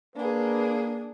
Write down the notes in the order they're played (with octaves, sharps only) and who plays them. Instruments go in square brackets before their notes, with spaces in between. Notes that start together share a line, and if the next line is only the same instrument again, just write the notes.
[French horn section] A#3 [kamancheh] D4 G#4 [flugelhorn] B4